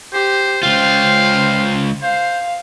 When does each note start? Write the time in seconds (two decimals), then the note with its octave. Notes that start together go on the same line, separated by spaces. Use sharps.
0.13 G4 C5
0.63 C#2 F4 C5 F5 G5
2.03 C5 F5